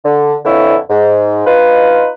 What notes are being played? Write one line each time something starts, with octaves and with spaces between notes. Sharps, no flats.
D3
F2 A#2 D3 E3 E4 C#5
G#2
D#4 F4 B4